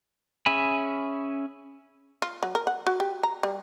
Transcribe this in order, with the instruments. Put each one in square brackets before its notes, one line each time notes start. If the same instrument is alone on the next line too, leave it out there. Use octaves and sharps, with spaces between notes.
[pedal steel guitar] C#4 G#4 E5 G#5 B5
[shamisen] F4
F#3
A#4
F#5
F#4
G4
A#5
G3